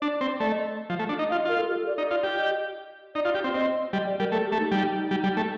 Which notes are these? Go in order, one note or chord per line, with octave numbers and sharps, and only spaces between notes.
D4 D5
C4
A3 D5
D#5
D#5
F3
A3
D4
D#4 D#5
F5
F4
D#5
F4 A#4
A4
G4
A4
D5
D#4 D5
F4
G4
D#5
D#4 D5
F4
G4
C4
C4 D#5
G3 D#5
D5
G3 A#4
A3 A4
G4
A3
D#4
G3
G3
G3
A3